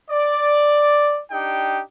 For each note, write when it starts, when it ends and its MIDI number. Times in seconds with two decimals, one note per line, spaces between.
0.11 1.21 74
1.31 1.82 62
1.31 1.82 63
1.31 1.82 67
1.31 1.82 79